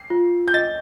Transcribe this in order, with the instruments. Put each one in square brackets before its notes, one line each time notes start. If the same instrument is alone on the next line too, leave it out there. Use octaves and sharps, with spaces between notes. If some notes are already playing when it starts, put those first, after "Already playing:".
Already playing: [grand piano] C7
[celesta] F4
[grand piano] G6
[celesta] D#5 [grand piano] A6